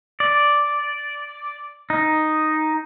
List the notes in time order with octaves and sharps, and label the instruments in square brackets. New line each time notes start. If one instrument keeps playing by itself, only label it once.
[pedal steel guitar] D5
D#4